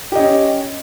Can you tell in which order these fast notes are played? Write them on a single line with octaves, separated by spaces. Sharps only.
G4 D#5 C#4